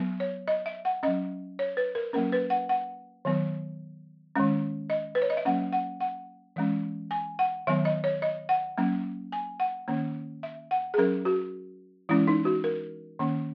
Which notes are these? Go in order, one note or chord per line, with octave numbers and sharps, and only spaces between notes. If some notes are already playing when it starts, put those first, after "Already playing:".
Already playing: F#3 B3
C#5
D#5
E5
F#5
F#3 C#4 D#5
C#5
B4
A#4
F#3 A#3 C#4 A#4
B4
F#5
F#5
D#3 F#3 B3
D#3 G#3 C#4
D#5
B4
C#5
D#5
E5
F#3 A#3 C#4 F#5
F#5
F#5
E3 G#3 C#4
G#5
F#5
D#3 F#3 B3 E5
D#5
C#5
D#5
F#5
F#3 A#3 C#4
G#5
F#5
D#3 A#3 C#4
E5
F#5
G#4
F#3 C#4 A#4
F#4
E3 G#3 C#4 E4
D#4
F#4
A#4
D#3 A#3 C#4